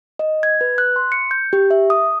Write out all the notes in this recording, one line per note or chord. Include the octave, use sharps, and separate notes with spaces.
D#5
G#6
B4
F#6
C6
C#7
G6
G4
E5
D#6